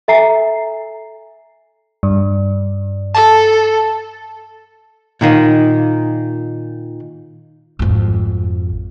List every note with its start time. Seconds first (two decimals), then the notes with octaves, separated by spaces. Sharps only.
0.08 A4 E5 G#5 A#5 C7
2.03 G2
3.15 A4 A5
5.21 A#2 D#3 A#3 D#4
7.79 G#1 F2